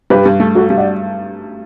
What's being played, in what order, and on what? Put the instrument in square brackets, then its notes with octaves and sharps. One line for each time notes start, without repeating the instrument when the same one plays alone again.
[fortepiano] G2 [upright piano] G4 B4
[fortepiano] G2
A3
[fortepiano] F#3 [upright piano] F#4 A4
[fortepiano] G2
[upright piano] D5 F#5